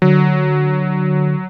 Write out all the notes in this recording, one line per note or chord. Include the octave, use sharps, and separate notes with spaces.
D3 F#3